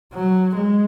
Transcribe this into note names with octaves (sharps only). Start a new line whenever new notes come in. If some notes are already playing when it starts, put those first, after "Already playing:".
F#3
G#3